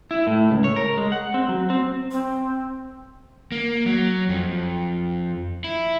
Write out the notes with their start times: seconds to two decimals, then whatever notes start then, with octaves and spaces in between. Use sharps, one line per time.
0.11 E4
0.27 A2
0.51 C#2
0.64 C#5
0.76 A#4
0.98 G#3
1.12 F#5
1.34 C4
1.49 F#3
1.70 C4
2.11 C4
3.52 A#3
3.86 F#3
4.29 F2
5.64 E4